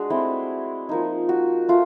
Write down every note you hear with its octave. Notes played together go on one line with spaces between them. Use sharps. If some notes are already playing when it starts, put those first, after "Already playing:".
Already playing: G#3 D4 F#4 G#4
A3 C4 E4
F3 A#3 D#4
F#4
A3 F4